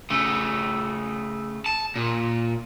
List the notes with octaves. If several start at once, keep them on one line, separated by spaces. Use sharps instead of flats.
C#3 A3
A5
A#2